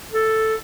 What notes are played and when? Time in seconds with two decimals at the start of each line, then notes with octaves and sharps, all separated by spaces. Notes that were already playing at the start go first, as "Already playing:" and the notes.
0.12 A4